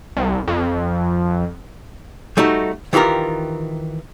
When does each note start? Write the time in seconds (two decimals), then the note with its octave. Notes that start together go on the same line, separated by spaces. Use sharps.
0.17 C2
0.47 F2
2.37 G3 A3 D#4 F#4
2.93 D#3 E3 F4 G4 A#4